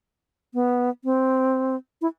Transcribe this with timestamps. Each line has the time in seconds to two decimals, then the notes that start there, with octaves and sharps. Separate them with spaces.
0.54 B3
1.04 C4
2.02 E4